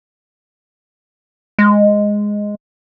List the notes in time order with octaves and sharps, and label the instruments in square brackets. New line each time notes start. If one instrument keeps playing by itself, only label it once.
[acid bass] G#3